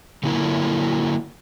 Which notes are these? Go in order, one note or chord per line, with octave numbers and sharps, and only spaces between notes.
D3 F#3 A#3 E4 F4 A#4